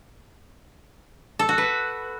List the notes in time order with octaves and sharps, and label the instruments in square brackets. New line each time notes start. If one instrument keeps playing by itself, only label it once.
[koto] A4
F#4
B4